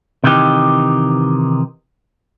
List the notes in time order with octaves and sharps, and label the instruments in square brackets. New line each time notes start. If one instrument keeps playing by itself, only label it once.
[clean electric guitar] C3 D#3 E3 D#4 G4